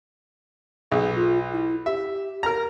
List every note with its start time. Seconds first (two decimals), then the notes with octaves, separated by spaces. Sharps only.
0.92 B1 G#4
1.16 F4
1.53 E4
1.86 G4 E5
2.43 A#4 A#5